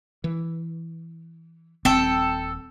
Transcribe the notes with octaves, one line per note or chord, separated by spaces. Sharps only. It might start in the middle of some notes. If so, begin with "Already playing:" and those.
E3
D#1 C4 A4 G5